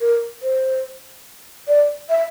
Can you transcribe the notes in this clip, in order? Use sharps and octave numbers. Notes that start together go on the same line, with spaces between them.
A#4
C5
D5
E5